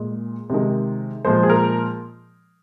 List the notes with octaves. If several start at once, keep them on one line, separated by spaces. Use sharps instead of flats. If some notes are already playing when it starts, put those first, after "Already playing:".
Already playing: A#2 G#3
C3 D#3 G#3
A#2 F3 G#3 C5
G#4
A#4